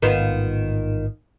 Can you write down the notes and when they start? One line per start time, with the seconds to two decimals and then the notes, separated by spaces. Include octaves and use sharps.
0.02 A1 G#2 D#3 B3 F4